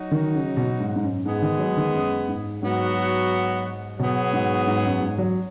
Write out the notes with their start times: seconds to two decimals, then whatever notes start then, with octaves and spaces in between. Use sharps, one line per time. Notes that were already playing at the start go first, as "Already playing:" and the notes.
Already playing: F#3 D#4 F#4
0.11 D#3
0.35 C#3
0.57 B2
0.80 G#2
0.96 G#2
1.03 F#2
1.25 G#2 G#3 B3 G#4
1.42 D#3
1.59 F#3
1.77 D#3
1.94 F#2
2.28 G#2
2.62 G#2 F#3 B3 F#4
3.99 B2 F#3 B3 G#4
4.33 G#2
4.67 G#2
4.85 F#2
5.01 G#2
5.18 F#3